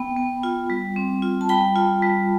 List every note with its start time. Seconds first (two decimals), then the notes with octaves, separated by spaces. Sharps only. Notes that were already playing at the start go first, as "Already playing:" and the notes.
Already playing: B3 G5 B5
0.17 B3
0.43 F4
0.70 G3
0.96 C4
1.22 F4
1.41 A5
1.49 G3 G5 B5
1.76 F4
2.02 G3